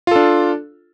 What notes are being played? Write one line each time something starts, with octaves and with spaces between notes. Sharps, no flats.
D4 F4 A4